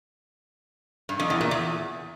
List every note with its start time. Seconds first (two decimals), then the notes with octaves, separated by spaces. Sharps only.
1.09 G2
1.20 F2
1.30 E2
1.41 A#2
1.51 E2